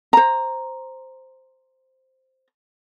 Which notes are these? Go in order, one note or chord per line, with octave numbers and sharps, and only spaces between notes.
C5 A#5